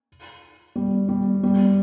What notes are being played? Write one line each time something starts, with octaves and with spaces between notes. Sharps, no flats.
G3
G3
G3